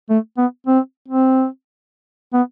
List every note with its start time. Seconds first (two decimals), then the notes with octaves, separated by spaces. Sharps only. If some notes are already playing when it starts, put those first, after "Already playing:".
0.10 A3
0.37 B3
0.67 C4
1.08 C4
2.34 B3